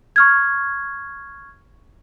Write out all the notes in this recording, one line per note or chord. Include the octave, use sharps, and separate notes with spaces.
C#6 F6 G#6